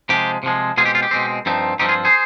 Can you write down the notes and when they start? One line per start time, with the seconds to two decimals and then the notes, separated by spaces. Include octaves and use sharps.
0.09 C3 F3 G#3 G4
0.43 C3 F3 G#3
0.77 B2 G#3 C4 F4 G#4
0.85 G4
0.95 F4
1.03 G4
1.11 B2 G#3 C4
1.46 G2 F3 C4 D#4
1.79 G2 F3 C4 D#4 G4
1.89 F4 G#4
2.05 G#4 C5